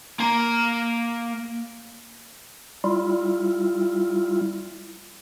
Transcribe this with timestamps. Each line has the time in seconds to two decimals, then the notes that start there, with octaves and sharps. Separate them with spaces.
0.20 A#3 A#5
2.84 G3 E4 F4